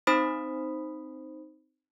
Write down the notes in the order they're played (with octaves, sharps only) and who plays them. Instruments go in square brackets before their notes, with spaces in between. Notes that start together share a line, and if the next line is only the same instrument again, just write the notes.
[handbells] C4 D#4 C5 B5 D#6 B6